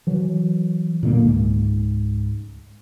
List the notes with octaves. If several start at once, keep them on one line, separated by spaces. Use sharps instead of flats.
E3 F#3
A#2 D3 G3 A#3
C#2 G#2